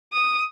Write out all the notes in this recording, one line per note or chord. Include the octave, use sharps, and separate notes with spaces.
D#6